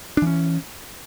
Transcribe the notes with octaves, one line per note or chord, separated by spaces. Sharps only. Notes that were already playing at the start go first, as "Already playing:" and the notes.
E3 C#4 D4